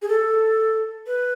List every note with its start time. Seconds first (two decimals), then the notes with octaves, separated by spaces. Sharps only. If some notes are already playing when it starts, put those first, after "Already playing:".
0.02 G#4
0.08 A4
1.07 B4